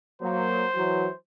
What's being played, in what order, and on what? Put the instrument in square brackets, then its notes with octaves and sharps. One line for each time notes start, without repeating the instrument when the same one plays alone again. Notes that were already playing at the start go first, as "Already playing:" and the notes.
[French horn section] F#3 A#3 [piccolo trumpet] C5
[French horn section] E3 F#3